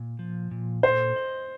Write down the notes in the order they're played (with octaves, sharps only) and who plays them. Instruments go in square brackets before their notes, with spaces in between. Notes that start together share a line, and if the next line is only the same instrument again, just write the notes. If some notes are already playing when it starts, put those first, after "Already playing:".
Already playing: [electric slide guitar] A#2
F3
A#2
[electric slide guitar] A4 [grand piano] C5
[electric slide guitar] D#5